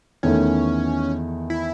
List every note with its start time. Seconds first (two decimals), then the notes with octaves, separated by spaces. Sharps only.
0.23 E2 D#3 A3 C#4
1.50 E4